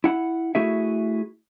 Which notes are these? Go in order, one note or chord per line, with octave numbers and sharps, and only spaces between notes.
E4 F#5
A3 E4 F#4 G#4 E5